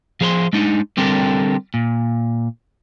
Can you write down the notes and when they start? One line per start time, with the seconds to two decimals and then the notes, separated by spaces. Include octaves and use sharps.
0.21 F3 G#4 C5 A#5 C6
0.53 G#3 D4 D#4
0.97 D3 G3 C4 G4 A4 A#4
1.74 A#2